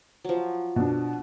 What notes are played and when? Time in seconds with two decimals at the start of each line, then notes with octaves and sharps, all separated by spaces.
0.25 F3 F#3
0.76 B2 D4